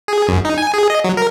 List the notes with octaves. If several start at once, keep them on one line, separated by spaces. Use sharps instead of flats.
G#4
F#2
D#4
G#5
G#4
D#5
F#3
A#4